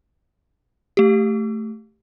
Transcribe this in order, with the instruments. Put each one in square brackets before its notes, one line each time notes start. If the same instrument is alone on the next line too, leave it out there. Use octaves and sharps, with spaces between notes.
[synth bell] A3 G4